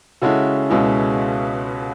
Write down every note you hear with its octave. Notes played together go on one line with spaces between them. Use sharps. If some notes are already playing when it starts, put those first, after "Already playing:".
C#3 G#3 C#4 E4 F#4 A4
C#2 B2 G#3 C#4 E4